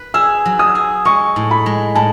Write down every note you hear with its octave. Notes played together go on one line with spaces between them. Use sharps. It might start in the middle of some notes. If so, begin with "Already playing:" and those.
Already playing: B4
G#4 E6
F#3
D#6
G#4
G#3 C#6
A2
B5
G#3
A2 A5